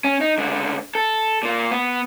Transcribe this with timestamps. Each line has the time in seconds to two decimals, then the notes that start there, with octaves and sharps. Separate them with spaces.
0.04 C#4
0.21 D#4
0.38 C#2 D3
0.95 A4
1.43 A#2 A#3
1.71 B3